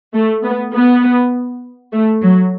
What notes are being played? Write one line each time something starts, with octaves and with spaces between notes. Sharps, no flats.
A3
B3
B3
A3
F#3